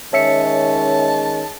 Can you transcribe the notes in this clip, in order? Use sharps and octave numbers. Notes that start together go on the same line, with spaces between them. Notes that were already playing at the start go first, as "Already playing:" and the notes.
D#3 G#3 C#4 C#5 E5 A5 C#7